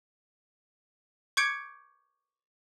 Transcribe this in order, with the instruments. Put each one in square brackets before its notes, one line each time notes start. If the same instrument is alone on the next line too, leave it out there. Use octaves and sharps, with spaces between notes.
[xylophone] C#6 D6 G6 G#6 C#7 D7